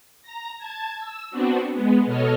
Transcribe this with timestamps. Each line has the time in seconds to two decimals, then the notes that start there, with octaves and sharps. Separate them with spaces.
0.22 A#5 A#6
0.58 A5 G#6
0.98 E6
1.31 B3 C4 D4 F#4
1.72 G#3 B3
2.06 B2 A4 C#5 D#5 F6